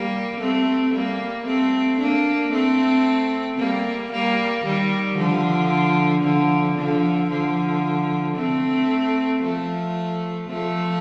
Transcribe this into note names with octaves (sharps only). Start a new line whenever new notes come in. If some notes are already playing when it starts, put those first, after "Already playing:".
Already playing: G3 A#3
A3 C4
G3 A#3
A3 C4
A#3 D4
A3 C4
G3 A#3
G3 A#3
D#3 G3
D3 F3
D3 F3
D3 F3
D3 F3
A3 C4
F3 A3
F3 A3